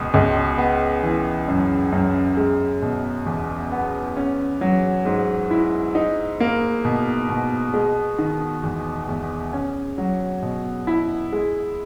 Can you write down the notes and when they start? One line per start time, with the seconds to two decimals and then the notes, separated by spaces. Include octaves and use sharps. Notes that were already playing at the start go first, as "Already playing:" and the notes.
Already playing: C#2 B2
0.14 C#2
0.58 B3
1.03 E3
1.48 F#2
1.92 F#2
2.37 G#3
2.82 B2
3.26 E2
3.72 B3
4.17 C#4
4.61 F#3
5.05 G#2
5.51 E4
5.95 D#4
6.40 A#3
6.85 B2
7.29 B2
7.74 G#3
8.18 D#3
8.63 E2
9.09 E2
9.53 C#4
9.98 F#3
10.42 B2
10.87 E4
11.32 G#3